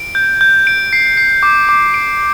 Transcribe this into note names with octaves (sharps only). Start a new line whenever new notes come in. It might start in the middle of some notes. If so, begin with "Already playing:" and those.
Already playing: D7
G6
G6
D7
C7
C7
D6
D6
D7